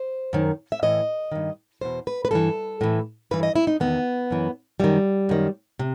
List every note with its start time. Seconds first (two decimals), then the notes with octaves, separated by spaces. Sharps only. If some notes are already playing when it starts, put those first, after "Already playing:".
Already playing: C5
0.33 F#2 D#3
0.72 E5
0.83 A2 E3 D#5
1.32 G2 D#3
1.81 E2 B2 C5
2.07 B4
2.25 B4
2.31 G2 E3 A4
2.81 A2 E3
3.31 G2 E3 B4
3.43 D#5
3.56 E4
3.67 D#4
3.80 E2 D#3 B3
4.30 F#2 E3
4.80 F#2 D#3 G3
5.29 F#2 D#3
5.79 C3